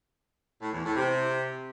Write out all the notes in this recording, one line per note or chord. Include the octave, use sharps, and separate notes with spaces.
A2
E2
A2
C3